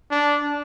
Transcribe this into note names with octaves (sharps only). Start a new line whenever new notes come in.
D4